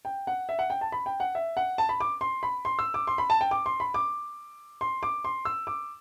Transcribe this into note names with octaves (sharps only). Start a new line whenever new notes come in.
G5
F#5
E5
F#5
G5
A5
B5
G5
F#5
E5
F#5
A5
B5
D6
C6
B5
C6
E6
D6
C6
B5
A5
G5
D6
C6
B5
D6
C6
D6
C6
E6
D6